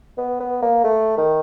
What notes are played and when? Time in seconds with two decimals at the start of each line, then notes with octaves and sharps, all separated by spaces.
0.18 B3
0.40 B3
0.62 A#3
0.84 A3
1.18 D#3